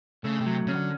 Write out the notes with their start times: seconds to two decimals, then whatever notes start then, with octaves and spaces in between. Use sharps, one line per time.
0.24 C#3 A3
0.41 C3
0.46 F#3
0.67 C#3 C#4
0.74 D3